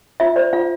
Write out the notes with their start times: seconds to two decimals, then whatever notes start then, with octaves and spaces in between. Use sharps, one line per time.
0.20 F4 E5
0.36 C5 D5
0.53 F4 F5